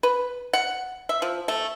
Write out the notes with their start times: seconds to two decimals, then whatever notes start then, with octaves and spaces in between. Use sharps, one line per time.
0.03 B4
0.53 F#5
1.09 E5
1.22 F3
1.48 A3